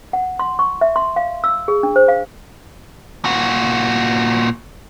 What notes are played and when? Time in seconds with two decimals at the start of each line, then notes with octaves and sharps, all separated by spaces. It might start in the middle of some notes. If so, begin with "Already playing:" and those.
0.13 F#5
0.39 C6
0.59 C#6
0.81 E5
0.96 C6
1.16 F5
1.44 E6
1.68 G#4
1.83 D4
1.96 C5
2.08 F5
3.25 A#2 F#4